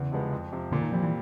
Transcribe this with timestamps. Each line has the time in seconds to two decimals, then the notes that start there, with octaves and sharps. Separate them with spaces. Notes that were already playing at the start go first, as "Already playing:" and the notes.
Already playing: E2 C#3
0.12 C3 F3 G#3 B3
0.32 F2
0.52 C3 F3
0.72 A#2 D3
0.82 D#3
0.92 F3 G3 C4
1.02 E3